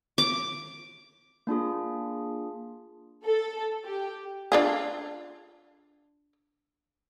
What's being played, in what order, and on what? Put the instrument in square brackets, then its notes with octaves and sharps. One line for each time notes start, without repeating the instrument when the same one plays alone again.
[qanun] D6
[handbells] A#3 D4 F4 G#4
[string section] A4
G4
[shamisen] D4 F4 G#4